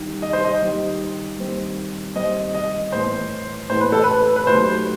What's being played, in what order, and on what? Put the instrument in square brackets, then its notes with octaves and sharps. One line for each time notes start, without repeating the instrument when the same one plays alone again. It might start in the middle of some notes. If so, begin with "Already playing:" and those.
Already playing: [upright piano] D#3 G3 D#4 G4
[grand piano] D#5
C5
D#5
[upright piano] D#3 G3 D#4 G4
D#3 G3 C4
[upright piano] D#3 G3 C4 [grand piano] D#5
[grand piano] D#5
[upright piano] A2 E3 B3 [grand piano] C5
[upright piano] A2 E3 B3 [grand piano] C5
[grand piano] B4
A4
B4
B4
[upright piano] B2 F#3 A3 D#4 G4 [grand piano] C5